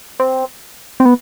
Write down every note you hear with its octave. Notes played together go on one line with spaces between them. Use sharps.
C4
C4
B3